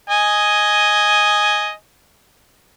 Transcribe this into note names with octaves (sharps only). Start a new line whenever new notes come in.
D#5 G#5